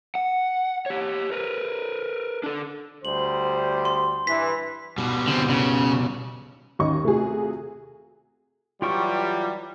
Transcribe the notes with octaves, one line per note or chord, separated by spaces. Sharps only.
F#5
G4 C#5
A#4 B4
D4 A4
D2 G3 C5 F#7
C6
G2 E3 B6
B2 G3
D3 C4
C#3
D#2 D#3 C#4 D#5 C#6
C3 A3 F4 F#4 G#4
E3 F#3 G3 F4 G5 C#6